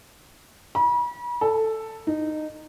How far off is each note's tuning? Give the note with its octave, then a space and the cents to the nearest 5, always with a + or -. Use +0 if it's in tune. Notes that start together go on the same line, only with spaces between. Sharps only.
B5 -40
A4 +5
D#4 -15